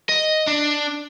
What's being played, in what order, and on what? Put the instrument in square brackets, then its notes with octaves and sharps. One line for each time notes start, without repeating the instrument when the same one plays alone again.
[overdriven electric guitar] D#5
D4